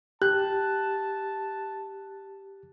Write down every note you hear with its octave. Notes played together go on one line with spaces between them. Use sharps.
G4 A5 F#6